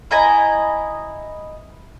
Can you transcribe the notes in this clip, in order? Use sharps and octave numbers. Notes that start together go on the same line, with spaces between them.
E4 D#5 G#5 A#5